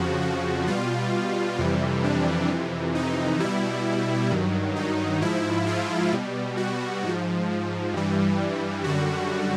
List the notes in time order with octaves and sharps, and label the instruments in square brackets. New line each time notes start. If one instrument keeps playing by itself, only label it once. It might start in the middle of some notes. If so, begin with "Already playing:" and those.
Already playing: [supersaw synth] F2 C#3 F3 F#4
F#4
B2 G3 F4
F2 C3 E3 G3
D4
F2 C3 E3
D#4
B2 G3 E4
G2 D#3 F#3
D#4
G#2 F3 E4
F4
B2 G3
F#4
G#2 F3
G2 E3 G3
F#2 D3 G3 F#4